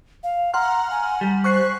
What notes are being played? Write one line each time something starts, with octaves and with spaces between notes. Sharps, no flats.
F5
F#5 A#5 C6 F6
G#5
G3
C5 C#6 F#6 C7